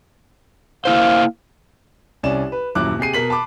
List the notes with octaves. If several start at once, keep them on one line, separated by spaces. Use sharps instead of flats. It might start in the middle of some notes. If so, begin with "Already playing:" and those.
A#3 E4 C5 F5
C2 C#4 D5 E7
B4
D#1 F#2 E4 D6 F#6
C3 G4 G#4 C7 D#7
B2 A#4 B6 F#7
A5 B5 D6